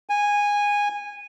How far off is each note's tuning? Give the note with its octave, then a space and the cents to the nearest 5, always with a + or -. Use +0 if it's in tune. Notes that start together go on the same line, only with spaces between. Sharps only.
G#5 -15